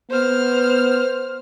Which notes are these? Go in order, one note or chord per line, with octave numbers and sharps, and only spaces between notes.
B3 C5 F6